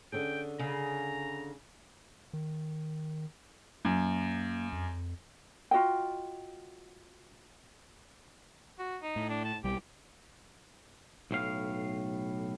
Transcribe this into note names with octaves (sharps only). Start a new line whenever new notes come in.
D3 C#4 G#4 G5
C#3 A#5
D#3
F#2 A#3
F2
F4 F#4 D#5 G5
F#4
D#4
A2
D4
A5
B1 G3 G4
B1 A2 F5